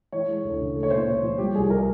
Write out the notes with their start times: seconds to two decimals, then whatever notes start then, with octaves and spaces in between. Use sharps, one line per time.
0.12 E3 C#5
0.28 G#3
0.44 D2
0.60 C#3
0.75 A3
0.83 C#5
0.90 A#2 C5
0.99 C#5
1.07 A#2
1.23 F3
1.38 G3 G4
1.54 C2 G#4
1.70 A#4